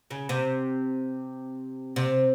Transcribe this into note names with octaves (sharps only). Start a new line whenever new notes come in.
C#3
C3
C3